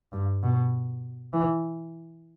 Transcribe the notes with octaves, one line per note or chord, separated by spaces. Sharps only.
G2
B2
E3